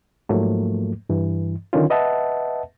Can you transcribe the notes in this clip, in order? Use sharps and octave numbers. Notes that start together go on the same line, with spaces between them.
G#2 F3 F#3 A3 A#3
G2 E3
D3 D#3 F#3 C#4 F4
B4 D#5 E5 F#5 A5